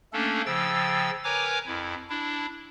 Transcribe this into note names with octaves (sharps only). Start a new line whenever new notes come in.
A3 A#3 C#4 D4 A4
C#3 F3 G5 E6 A6
A#4 B4 C#5 G#5 A#5 D6
F2 E4
D4 E4